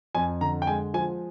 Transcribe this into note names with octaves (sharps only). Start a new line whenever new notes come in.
F2 G#5
D3 A#5
G5
G#3 G#5
F3 G#5